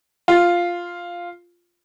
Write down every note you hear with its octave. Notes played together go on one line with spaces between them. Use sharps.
F4